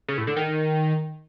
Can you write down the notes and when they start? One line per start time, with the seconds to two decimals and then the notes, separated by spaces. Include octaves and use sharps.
0.08 C#3
0.18 A2
0.27 D3
0.36 D#3